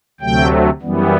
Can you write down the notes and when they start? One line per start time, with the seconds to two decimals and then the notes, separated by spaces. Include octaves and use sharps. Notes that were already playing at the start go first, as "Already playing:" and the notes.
0.21 D2 C3 F#3 A3 G5
0.81 F#2 E3 G3 B3